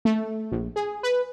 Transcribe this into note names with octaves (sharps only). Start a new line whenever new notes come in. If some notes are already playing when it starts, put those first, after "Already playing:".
A3
A#1
G#4
B4